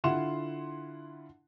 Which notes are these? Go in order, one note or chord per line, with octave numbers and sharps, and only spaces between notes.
D3 E4 F4 F#5 C6 E7